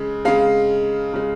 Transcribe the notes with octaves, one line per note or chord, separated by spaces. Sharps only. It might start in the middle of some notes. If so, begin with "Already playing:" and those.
Already playing: C#3 G#3
C#3 G#3 F5
C#3 G#3